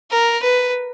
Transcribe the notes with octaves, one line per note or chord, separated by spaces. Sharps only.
A#4
B4